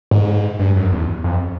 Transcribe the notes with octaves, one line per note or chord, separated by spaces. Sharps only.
G#2
G2
F#2
E2
F2